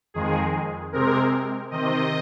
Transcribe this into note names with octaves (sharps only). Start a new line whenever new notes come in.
F2 D#3 G#3 G#4
C3 G#3 C4 A#4
C3 D#3 C4 D#5